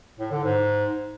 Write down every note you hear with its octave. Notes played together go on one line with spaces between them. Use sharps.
A2
D3
G#2